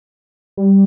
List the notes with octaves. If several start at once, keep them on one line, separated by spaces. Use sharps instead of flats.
G3